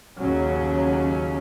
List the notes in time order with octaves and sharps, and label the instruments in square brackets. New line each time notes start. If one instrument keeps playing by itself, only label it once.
[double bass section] D#2 C#3 F#3 C#4